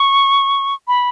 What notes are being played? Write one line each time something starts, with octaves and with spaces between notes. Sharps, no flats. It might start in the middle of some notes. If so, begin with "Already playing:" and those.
Already playing: C#6
B5